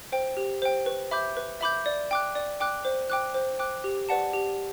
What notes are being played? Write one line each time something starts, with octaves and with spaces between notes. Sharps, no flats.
C5 G5
G4
C5 G5
B4
E5 B5 D6 G6
B4
E5 B5 D6 G6
D5
G5 D6 F#6
D5
G5 D6 F#6
C5
G5 D6 F#6
C5
G5 D6 F#6
G4
B4 D5 F#5 A5
G4